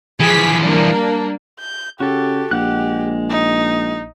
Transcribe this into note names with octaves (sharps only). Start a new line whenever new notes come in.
E3 F3 G#4 B6
G3 A#3 D4
G6
C#3 F#4 G4 A4
A#1 G#3 G4 F#5 F#6
D#4